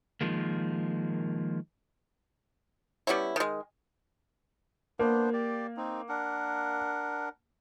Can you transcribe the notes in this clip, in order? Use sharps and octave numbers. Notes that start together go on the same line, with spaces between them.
D#3 F3 G#3 A#3
G3 B3 C#4 E4
D#3 G#3
A#3 B3 D4 C5
G4 D5
C4 D#4
D4 A#4 F#5